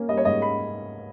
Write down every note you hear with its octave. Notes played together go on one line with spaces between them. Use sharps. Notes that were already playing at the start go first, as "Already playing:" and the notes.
Already playing: A#3 C#4
G3 D#5
C#5
G#2 D#5
A#3 B5